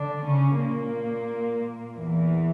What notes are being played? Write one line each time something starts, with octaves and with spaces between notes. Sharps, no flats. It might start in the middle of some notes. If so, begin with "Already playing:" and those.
Already playing: D3 D4
C#3 C#4
A#2 A#3
E2 E3